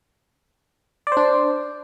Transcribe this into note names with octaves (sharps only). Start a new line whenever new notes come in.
D4 C5 D5